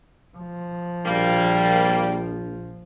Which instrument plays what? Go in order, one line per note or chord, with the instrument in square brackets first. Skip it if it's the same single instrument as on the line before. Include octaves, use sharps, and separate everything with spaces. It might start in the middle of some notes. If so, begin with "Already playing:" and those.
[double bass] F3
[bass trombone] A#1 [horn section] G3 A#3